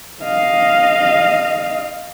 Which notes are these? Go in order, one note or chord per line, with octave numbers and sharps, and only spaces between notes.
D#5 F5